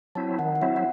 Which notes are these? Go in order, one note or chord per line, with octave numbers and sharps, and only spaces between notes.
F#3 C4 E4 A5
D#3 F#5
F#5
F#3 C4 E4 E5
F#5